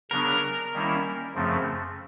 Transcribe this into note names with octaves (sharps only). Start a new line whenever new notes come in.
C#3 F#3 B3 D4 A#4
D#3 G3 A#3 C#4 E4
F#2 C#3 F3 A3 C4